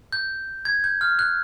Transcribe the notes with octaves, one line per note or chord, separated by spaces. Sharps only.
G6
G#6
G6
F6
F#6